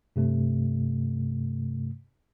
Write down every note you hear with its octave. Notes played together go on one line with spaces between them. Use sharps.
G2 C3 A3